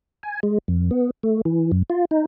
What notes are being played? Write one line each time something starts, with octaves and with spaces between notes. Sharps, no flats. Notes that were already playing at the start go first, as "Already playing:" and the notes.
G#5
G#3
F2
B3
A3
E3
F#2
F4
D#4